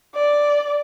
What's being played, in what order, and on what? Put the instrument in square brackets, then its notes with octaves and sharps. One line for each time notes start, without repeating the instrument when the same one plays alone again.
[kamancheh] D5